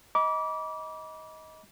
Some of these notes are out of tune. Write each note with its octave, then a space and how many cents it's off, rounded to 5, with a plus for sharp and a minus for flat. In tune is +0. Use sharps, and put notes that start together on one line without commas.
D#5 +20 B5 -40 D6 -20